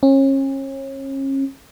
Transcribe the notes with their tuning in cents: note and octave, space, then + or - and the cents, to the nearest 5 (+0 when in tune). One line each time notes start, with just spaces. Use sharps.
C#4 -35